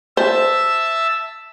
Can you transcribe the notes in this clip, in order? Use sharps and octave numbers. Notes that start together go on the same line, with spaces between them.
C5 E5 A5 E6